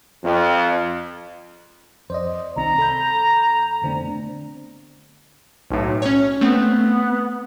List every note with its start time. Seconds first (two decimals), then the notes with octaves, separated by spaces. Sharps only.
0.24 F2
2.10 F2 C5 D5 D#5
2.56 C2 D#3 C4 A#5
2.78 A4 B5 G6
3.84 D3 A3 B3 C4 D4
5.71 B1 A2
6.02 C#4 C#5
6.41 A3 B3 C4